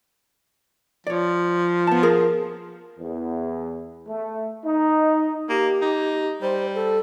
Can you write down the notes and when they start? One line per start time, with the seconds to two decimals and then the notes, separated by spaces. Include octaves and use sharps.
1.07 F3 C#5 D5
1.87 B3 A5
2.03 G#4 A#4
2.99 E2
4.08 A3
4.65 D#4
5.49 A#3 G4
5.82 D#4
6.42 G3 C5
6.75 A4